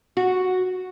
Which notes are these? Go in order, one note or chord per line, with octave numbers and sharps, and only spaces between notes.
F#4